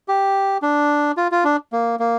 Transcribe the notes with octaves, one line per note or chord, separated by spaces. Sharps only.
G4
D4
F4
F4
D4
A#3
A#3